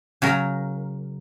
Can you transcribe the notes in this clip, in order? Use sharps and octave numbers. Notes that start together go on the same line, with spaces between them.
C#3 F#3 A#4